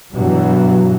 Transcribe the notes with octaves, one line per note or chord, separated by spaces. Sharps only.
G2 B2 E3 F#3